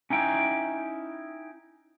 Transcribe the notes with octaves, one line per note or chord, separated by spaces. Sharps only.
C#4 D#4 E4 G5